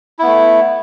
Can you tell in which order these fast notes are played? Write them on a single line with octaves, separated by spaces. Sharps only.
E4 B3 A3